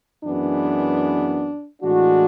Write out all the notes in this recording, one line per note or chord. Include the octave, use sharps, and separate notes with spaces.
F#2 E3 G#3 B3 D4
A2 E3 G#3 D4 F#4